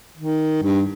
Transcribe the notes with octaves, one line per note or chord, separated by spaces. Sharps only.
D#3
G2